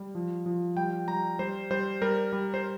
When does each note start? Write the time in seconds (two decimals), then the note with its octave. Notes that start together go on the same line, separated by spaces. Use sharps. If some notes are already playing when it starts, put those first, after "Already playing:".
Already playing: G3
0.15 F3
0.46 F3
0.76 G3 G5
1.08 G3 A#5
1.39 G3 C5
1.71 G3 C5
2.02 G3 A#4
2.33 G3
2.54 C5